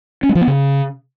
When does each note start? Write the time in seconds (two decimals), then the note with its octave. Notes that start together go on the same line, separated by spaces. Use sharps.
0.23 C#4
0.29 G#3
0.35 F3
0.41 B3
0.47 C#3